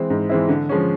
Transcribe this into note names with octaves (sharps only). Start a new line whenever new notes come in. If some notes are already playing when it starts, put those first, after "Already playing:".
Already playing: E3 G#3 C4 E4
G#2
E3 G#3 C4 E4
D3
F3 G#3 C#4